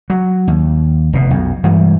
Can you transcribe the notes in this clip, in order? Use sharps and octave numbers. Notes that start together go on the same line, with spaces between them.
F#3
D#2
F1 B2
B1 F2
G2 E3 G3 G#3